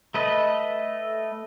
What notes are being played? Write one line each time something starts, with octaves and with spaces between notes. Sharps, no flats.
A3 B4 D#5